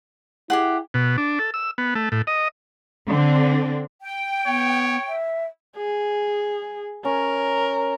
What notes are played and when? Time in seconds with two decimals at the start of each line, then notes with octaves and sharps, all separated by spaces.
0.50 E4 G4 G#4 F#5
0.94 B2
1.18 D4
1.39 A4
1.54 E6
1.78 B3
1.95 A3
2.12 A2
2.27 D#5
3.08 D3 C4 D4
4.02 G5
4.46 B3 C#5
5.07 E5
5.77 G#4
7.05 C#4 A#4